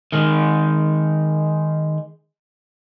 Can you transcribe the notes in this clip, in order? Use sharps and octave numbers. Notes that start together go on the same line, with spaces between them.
D#3 G#3